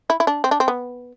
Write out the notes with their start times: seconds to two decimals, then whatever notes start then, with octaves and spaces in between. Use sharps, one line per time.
0.10 E4
0.20 E4
0.27 D4
0.44 C4
0.51 D4
0.60 C4
0.68 B3